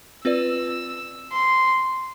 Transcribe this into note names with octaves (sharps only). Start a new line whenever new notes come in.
C4 F4 B4 D5 E6
C6